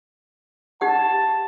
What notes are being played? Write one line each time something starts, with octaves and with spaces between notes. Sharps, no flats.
D#4 G4 F#5 A5